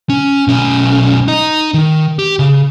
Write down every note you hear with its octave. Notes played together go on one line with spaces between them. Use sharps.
C#4
B1 C#4
D#4 D#5
D#3
G4
C#3